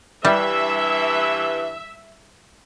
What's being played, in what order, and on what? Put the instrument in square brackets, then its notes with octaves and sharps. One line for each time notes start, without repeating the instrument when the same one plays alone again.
[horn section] G2 E3 [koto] G3 [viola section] E5